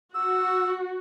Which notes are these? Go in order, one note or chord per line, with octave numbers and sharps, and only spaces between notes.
F#4 E6